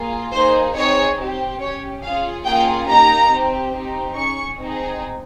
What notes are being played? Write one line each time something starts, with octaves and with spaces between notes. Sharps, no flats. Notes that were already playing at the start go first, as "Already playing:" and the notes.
Already playing: A#3 F4 G#4
A#3 D#4 G#4 C5
C4 D#4 G#4 C#5
C4 G4
C#4 G4 C#5
C#4 F4 G#4 F5
A#3 C#4 F4 G#4 G5
A#3 D#4 G4 A#5
C4 G4
C4 D#4 G4
C#4 G#4 C#6
C4 D#4 G#4